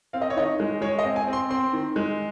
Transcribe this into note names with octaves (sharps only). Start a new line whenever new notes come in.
C4 F5
D#5
C#5
D#3 D#5
G#3
G#3 C#5
D#5
C4
G#5
C4
C6
C4 C6
D#3
G#3